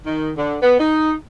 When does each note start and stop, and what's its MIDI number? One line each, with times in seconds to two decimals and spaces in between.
0.06 0.31 51
0.37 0.55 50
0.62 0.77 59
0.79 1.12 63